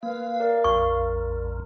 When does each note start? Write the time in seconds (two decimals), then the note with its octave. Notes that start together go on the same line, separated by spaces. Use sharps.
0.03 A#3 B4 F5
0.40 A#4 D5
0.64 A#1 F2 C#6